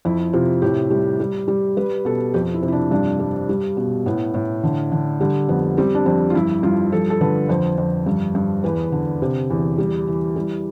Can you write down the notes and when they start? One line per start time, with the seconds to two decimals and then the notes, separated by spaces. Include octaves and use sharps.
0.05 F2 E4
0.33 C3 F4
0.62 A2 G4
0.90 G3
1.20 G3
1.48 G3
1.77 G3 B4
2.05 B2 A4
2.34 F2 G4
2.54 E4
2.62 C3
2.68 E4
2.72 D4
2.91 G2 D4
3.19 G3
3.49 G3
3.77 B2
4.06 A2 B3
4.34 A2
4.64 D3
4.92 D3
5.21 D3 G3
5.49 F2 B3
5.77 G3 C4
5.95 D4
6.06 F2 C4
6.30 F4
6.35 G2 E4
6.63 G2 F4
6.92 F3 A4
7.10 A4
7.21 D3 B4
7.49 F2 C5
7.78 F2
8.06 G2
8.35 G2
8.64 E2 B4
8.92 D3
9.22 C3
9.50 E2
9.78 G3
10.07 E3
10.36 G3